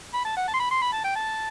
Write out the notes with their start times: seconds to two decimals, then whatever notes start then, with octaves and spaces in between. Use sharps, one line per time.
0.14 B5
0.25 A5
0.36 F#5
0.48 A5
0.54 C6
0.59 B5
0.71 C6
0.82 B5
0.93 A5
1.04 G5
1.15 A5